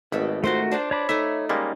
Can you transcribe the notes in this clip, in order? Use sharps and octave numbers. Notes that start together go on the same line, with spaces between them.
G#1 B2 A3 A4 B5
A3 F4 F#4 A4 A#4 C5
D4 C5 D5 A5
D4 C#5 B5 D6
A3 D#4 E5 G#5 A#5
G3 G#3 A#3 C#4